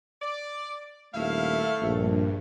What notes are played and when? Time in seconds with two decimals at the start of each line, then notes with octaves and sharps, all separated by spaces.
0.22 D5
1.14 D#1 A3 E4 F5
1.82 A#1 G2